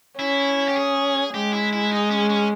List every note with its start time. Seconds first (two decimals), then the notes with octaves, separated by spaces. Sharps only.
0.19 C#4 E4
0.68 G4
0.77 G#4
1.34 G#3 G4
1.53 E4
1.73 E4
1.91 D#4
2.10 C#4
2.29 C#4